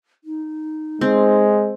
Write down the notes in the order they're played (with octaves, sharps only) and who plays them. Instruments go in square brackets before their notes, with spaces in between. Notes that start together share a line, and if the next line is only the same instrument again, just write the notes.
[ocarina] D#4
[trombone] G#3 [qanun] C4